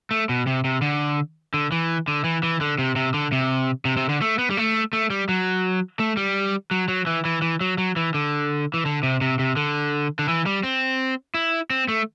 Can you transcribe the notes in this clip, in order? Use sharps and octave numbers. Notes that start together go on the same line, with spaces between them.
A3
B2
C3
C3
D3
D3
E3
D3
E3
E3
D3
C3
C3
D3
C3
C3
C3
D3
A3
B3
G3
A3
A3
G3
F#3
A3
G3
F#3
F#3
E3
E3
E3
F#3
F#3
E3
D3
E3
D3
C3
C3
C3
D3
D3
E3
G3
C4
E4
C4
A3